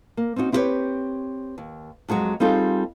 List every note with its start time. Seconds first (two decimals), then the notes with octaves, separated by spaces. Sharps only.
0.17 A#3
0.36 C4 C#4 D#4 F#4
0.52 C4 E4 G4 G#4 B4 C#5
1.58 D#2
2.08 F2 F#3 G#3 F#4
2.40 G3 C4 D#4 F4 G#4 A4